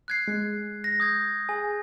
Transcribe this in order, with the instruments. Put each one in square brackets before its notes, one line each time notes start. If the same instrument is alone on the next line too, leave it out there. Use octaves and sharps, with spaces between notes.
[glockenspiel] F#6 G#6 C7
[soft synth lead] G#3
[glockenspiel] A#6
D#6 G6 G#6
[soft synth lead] G#4 [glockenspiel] G#5